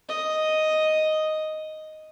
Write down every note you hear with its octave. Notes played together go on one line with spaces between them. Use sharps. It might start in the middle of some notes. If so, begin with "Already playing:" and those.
D#5